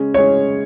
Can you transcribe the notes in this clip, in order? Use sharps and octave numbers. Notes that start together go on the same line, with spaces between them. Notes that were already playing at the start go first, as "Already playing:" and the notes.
Already playing: C#3 G#3 C#4 G#4
C#3 G#3 C#4 G#4 C#5